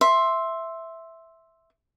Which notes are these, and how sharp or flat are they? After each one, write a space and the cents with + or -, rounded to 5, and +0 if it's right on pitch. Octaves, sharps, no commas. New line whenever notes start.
E5 +0 C6 +5